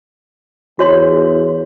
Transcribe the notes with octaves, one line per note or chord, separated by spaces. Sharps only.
E2 F#4 C#5 C6